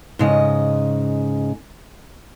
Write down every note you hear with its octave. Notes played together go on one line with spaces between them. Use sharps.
G#2 C#3 D#5